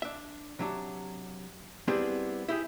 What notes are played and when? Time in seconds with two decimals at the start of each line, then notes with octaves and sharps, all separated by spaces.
0.02 D4 E5
0.59 C3 F#3 D4
1.88 G3 B3 C4 D4 E4 G#4
2.48 E4 G4 G#4